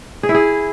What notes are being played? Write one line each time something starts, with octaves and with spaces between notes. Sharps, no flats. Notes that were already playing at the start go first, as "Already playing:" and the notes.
G#4
E4
G#4